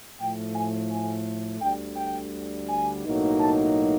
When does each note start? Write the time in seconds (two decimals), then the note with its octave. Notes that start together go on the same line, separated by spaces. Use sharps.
0.18 A2 F3 A3 G5
0.54 G#5
0.90 G#5
1.61 D2 D3 G3 G5
1.96 G5
2.68 G#5
3.04 B1 A2 F#3 A#3 D#4
3.40 A5